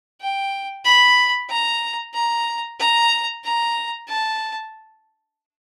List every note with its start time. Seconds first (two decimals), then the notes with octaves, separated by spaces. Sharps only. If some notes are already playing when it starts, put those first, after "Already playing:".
0.21 G5
0.85 B5
1.49 A#5
2.14 A#5
2.79 A#5
3.44 A#5
4.08 A5